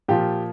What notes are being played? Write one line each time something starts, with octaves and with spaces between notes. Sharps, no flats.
A#2 F3 G4